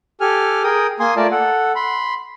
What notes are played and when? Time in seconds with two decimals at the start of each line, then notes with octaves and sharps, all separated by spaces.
0.21 G4 A4 G#5 F6
0.64 G#4 A#4 G5 D#6
1.00 A#3 G#5 C6 D#6
1.16 A3 F4 A#4 D5 A5
1.31 A4 F#5
1.75 B5 C6